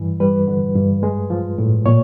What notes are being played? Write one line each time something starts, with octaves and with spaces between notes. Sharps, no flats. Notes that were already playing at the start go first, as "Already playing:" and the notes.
Already playing: G2 E3
G3 B4
D3
G2
G#3
F3
A2
A#2 C#5